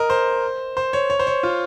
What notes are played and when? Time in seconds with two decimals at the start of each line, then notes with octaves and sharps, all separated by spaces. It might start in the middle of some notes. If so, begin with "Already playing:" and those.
Already playing: A#4 D#5
0.10 C5
0.77 C5
0.93 C#5
1.10 C#5
1.19 C5
1.27 C#5
1.43 F4